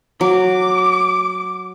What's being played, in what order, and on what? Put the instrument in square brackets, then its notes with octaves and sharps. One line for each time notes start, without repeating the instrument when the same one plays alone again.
[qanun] F#3 [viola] D6